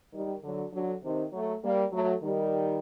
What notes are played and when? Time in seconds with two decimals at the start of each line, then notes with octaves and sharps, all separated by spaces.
0.13 D#3 G3
0.43 D3 F#3
0.73 D3 F#3
1.03 C3 D#3
1.33 F#3 A3
1.63 G3 A#3
1.92 F#3 A3
2.22 D#3 G3